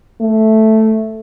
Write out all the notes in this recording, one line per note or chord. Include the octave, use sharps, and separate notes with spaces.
A3